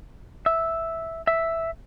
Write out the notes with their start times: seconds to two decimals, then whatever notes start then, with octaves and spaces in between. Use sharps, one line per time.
0.46 E5
1.27 E5